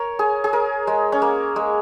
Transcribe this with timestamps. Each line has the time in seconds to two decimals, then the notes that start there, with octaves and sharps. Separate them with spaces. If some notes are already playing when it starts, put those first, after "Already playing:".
Already playing: A#4 C#5
0.19 G#4
0.44 G#4
0.53 A#4
0.87 G#3
1.12 C#4
1.22 A#3
1.56 G#3